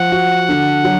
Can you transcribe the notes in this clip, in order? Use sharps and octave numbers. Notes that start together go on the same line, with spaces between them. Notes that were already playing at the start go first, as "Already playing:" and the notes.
Already playing: F3 F#5
F#4
D3
F#3